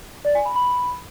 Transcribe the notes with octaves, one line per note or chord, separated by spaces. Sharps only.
D5
G#5
B5
B5